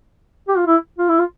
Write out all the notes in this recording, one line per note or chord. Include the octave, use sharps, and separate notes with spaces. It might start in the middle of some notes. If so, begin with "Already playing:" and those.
G4
F4
E4
F4
E4
F4